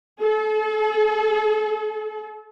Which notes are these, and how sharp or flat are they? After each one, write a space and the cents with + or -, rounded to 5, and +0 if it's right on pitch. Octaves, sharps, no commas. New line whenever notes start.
A4 -40